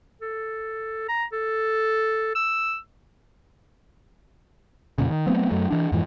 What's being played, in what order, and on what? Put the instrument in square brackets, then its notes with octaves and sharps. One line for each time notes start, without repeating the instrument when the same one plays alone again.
[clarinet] A4
A#5
A4
E6
[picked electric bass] F2 A#2 C#3
D#3
F#3 A3 B3 C4
F#2 F#3 A3
E3 D4
F2 G#2 E3